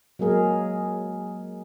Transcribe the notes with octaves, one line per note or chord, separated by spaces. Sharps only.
F#3 G#3 A#3 G#4 A#4